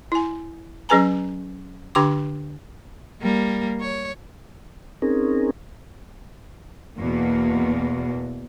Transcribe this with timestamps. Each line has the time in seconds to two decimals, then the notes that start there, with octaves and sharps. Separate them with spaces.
0.12 E4 G#5
0.89 F#3 C#4 G#4 B4 G#5 A#5
1.95 D3 D4 G4 G5 C6 D6
3.22 G3 A#3
3.81 C#5
5.02 C4 C#4 D#4 G#4 A#4
6.99 E2 B2 A#3